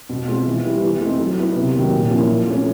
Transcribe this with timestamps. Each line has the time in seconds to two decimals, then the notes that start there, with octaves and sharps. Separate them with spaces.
0.10 B2
0.28 G#3 C4 F4
0.46 E3
0.65 G3 B3 E4
0.83 E3
1.01 A3 C4 D#4
1.19 F#3
1.38 B3 E4
1.56 C3
1.74 D#3 F#3 A#3
1.92 A#2
2.10 F3 A#3 C#4 E4
2.28 F3
2.47 A3 C#4